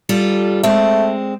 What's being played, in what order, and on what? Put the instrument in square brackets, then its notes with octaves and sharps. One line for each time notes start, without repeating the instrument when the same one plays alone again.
[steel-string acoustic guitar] G3 F4 A4
[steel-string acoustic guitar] G#3 C4 [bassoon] A3